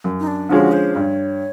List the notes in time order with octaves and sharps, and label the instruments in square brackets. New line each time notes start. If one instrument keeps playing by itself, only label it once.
[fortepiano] F#2
[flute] D#4
D4
[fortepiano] D3 F3 G#3 C#4 [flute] F#4
[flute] C5
[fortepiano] G2 [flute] C#5